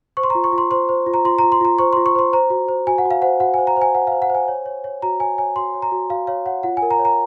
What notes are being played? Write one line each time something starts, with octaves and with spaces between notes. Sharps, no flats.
C5 C#6
C6
A#5
F4
C#6
F4
C6
C5 C6
C5
F4
A#5
F4 C6
A#5
F4
C6
F4 A#5
C5 C#6
C6
F4
C#6
C5 C6
C5 A#5
F#4
C5
F#4 G#5
F#5
F#4
F5
C5 F#5
F#4 F#5
G#5
C5
A#5
C5 G#5
C5 F#5
F5
C5
F#5
C5 G#5
C#5
C#5
C#5
F#4 A#5
C#5 G#5
C#5 G#5
F#4 C6
C#5
A#5
F#4
F#4 F5
C#5 F5
C#5 F#5
F4 F#5
G#5
A#4
A#5
C#5
A#5